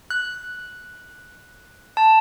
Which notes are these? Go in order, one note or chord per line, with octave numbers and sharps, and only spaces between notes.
F#6
A5